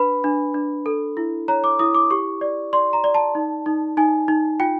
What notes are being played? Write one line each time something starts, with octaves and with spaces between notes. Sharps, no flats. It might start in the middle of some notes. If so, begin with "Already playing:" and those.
Already playing: D4 B4 B5
D4
D4
A4
E4
C#5 A#5
D6
E4 D#6
D6
G4 C#6
D5
D5 C6
A#5
D5
A5
D#4
D#4
D#4 G#5
D#4
F4 G5